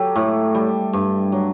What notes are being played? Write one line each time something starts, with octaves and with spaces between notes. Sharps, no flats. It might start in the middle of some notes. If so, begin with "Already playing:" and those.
Already playing: F#3 G4 A4
A2
G3
G2
F#3